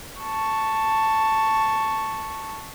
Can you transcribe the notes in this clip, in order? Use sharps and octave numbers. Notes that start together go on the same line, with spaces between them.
A5 C#6